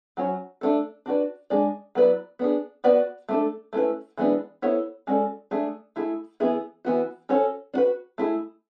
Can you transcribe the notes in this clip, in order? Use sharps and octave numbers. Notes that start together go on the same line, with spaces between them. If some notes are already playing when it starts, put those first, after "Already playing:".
F#3 C#4 F#4 C#5
A3 D4 A4
D4 F#4 B4 D5
G#3 D4 G#4 D5
F#3 B3 E4 B4 D5
B3 D4 G#4
B3 F#4 B4 D5
A3 D4 A4
A3 C#4 E4 B4
E3 G#3 B3 D4
B3 E4 A4 C#5
G#3 C#4 F#4 A4 D5
A3 D4 G#4
A3 E4 G#4
E3 B3 E4 G#4
E3 B3 F#4
C#4 F#4 A4 C#5
D4 F#4 B4
A3 E4 G#4